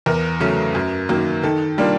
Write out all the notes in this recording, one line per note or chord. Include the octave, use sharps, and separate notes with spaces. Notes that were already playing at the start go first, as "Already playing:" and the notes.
E2 A#4
C#3 F#3 A3 C#4
F#2
D#3 F#3 A#3
D#3 A4
G3 A#3 D4 F4